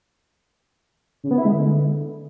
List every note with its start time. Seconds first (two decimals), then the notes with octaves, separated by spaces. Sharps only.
1.24 C#3
1.31 B3
1.38 E4
1.45 G#3
1.52 D3